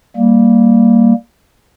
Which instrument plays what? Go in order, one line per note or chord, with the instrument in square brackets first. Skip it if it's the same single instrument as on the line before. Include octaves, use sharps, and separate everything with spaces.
[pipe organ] G3 A#3